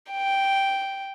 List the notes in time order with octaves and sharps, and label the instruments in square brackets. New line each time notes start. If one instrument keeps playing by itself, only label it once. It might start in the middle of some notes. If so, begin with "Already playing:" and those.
[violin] G5